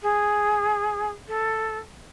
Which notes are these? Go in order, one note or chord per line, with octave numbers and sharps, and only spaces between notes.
G#4
A4